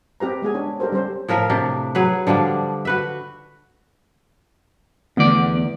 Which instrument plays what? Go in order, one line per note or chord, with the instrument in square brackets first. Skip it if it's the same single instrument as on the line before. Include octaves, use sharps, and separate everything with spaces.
[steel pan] C4 G4 B4 A#5
G#3 B3 G#4 G#5
D4 C#5
D4 G4 A4 A#4 C5
G3 C#4 C5
[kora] A2 F3 A#4 E5
C3 D4
F#3 G#4 B4
D3 F3 G3 D4
F#4 B4 E5
[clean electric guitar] E2 D5 [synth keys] D3 F3 A3 [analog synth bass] B3